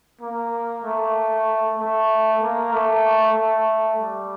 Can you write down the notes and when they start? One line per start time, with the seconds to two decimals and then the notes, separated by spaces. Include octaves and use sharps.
0.21 A#3
0.84 A3
1.79 A3
2.42 A#3
2.72 A3
3.36 A3
3.99 G3